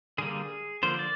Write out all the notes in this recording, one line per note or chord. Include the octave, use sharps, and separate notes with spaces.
D3 G3 A#3 G#4
D3 F3 A#3 C5
D5